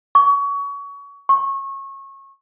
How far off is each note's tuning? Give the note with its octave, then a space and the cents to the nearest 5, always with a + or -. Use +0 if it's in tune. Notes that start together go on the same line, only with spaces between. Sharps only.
C#6 +25
C#6 -25